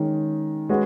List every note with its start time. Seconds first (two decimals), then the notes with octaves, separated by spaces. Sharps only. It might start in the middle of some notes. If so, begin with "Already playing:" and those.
Already playing: D#3 G#3 C#4
0.69 G#3 C#4 F#4 B4